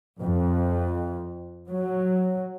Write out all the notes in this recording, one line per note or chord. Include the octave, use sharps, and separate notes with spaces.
F2
F#3